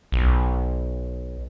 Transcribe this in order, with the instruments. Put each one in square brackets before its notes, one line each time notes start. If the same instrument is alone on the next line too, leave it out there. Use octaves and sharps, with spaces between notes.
[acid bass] B1